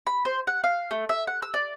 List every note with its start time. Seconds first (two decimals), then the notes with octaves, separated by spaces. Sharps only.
0.07 B5
0.25 C5
0.47 F#5
0.64 F5
0.91 A3
1.09 E5
1.27 F#5
1.42 E6
1.54 D5